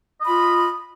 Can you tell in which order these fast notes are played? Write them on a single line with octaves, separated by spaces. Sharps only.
D#5 B5 F4